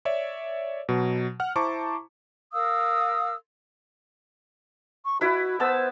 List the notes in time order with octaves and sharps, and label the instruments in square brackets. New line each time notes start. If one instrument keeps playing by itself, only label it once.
[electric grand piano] C#5 D5 E5
B2 F#3
F#5 F6
E4 C5 A5 A#5 C#6 D6
[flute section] A#4 F5 D#6 E6
[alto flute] C#6
[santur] E4 B4 [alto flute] F#4
[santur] B3 A5 E6 [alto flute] C5